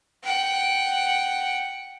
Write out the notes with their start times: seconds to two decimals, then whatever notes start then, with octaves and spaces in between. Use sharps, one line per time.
0.23 F#5 G5